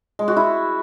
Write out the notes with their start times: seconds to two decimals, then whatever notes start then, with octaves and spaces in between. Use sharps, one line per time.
0.19 G#3
0.28 F#4
0.37 E4